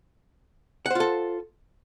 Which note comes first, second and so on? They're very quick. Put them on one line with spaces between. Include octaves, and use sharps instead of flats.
F#5 C5 F4 A4